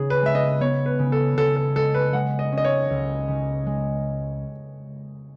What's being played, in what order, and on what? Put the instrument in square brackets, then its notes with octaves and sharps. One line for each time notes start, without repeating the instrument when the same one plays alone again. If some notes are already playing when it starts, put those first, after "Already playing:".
Already playing: [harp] C#3 B3 [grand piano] G#4
[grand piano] B4
[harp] G#3 [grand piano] E5
[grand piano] D#5
[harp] B3 [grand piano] C#5
[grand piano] B4
[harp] C#3
[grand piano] A4
[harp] C#3 [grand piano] A4
[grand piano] A4
[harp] G#3 [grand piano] A4
[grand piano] B4
[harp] G#3 [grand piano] F#5
[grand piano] D#5
[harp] C#4
[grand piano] D#5
C#5
[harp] C#2
C#3
G#3